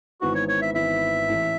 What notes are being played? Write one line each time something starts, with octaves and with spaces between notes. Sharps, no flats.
G#1 G#2 E3 B3 E4 F#4
C#5
C#5
E5
G#1 G#2 E3 B3 E4 E5
A1 A2 E3 A3